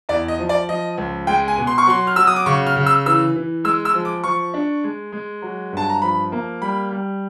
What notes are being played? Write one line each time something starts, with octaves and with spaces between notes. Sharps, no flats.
E2 D5
D#5
F3
D5
F3 D#5
C#2
G#3 G5
G#5
B2
C6
C#6
F#3 C6
F6
F#3 E6
D#6
D6
C#3 C#6
F6
C#3
E6
E3 E6
E3
G#3 E6
E6
F3
D6
F3 C#6
D4
G#3
G#3
F#3
G2 A5
A#5
F3 B5
A#3
G3 B5
G3